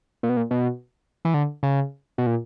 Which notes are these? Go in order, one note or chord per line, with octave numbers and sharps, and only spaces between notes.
A#2
B2
A#2
B2
E3
D3
C#3
B2
A#2